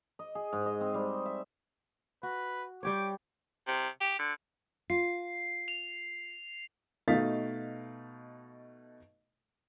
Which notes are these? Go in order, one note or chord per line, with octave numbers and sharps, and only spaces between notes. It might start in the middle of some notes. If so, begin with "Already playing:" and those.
D#5
G#4
G#2
D#5
C4
G3
E5
F#4 B4
G3 G4 C#5 D6
C3
G4
D3
F4 C7
F7
B2 A3 D#4 F5 A6 B6